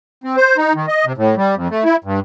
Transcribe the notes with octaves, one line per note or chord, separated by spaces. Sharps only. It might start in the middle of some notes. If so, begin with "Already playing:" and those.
C4
C5
D#4
D#3
D#5
C3
A2
G3
F2
A3
E4
G2